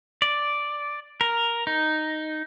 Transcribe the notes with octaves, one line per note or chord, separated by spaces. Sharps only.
D5
A#4
D#4